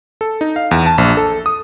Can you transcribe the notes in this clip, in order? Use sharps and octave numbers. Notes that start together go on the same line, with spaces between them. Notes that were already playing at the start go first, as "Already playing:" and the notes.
A4
D#4
F5
E2
A5
A#1
A4
D#6